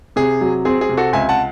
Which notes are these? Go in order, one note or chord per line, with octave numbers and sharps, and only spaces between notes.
C3 G#4
F#3
C4 G#4
G#4
C3
F#4 A4
C#2 E5 G#5
F#5 A5